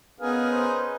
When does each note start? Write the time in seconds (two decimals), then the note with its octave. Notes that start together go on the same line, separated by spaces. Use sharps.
0.20 B3 C#4 D#4 G#4 A#4 B4 F5
0.52 C5